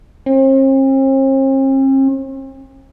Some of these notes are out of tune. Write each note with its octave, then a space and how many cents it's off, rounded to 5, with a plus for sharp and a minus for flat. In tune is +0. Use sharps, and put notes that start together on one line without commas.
C4 +45